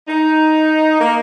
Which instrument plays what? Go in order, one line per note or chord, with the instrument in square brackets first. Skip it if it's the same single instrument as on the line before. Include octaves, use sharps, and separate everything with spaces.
[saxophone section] D#4
A#3